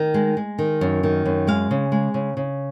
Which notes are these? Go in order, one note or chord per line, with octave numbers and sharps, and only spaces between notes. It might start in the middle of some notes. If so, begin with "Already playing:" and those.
Already playing: D#3
G#3
G#3
D#3
F#2
D#3
F#2
G#3 F5
C#3
G#3
C#3
C#3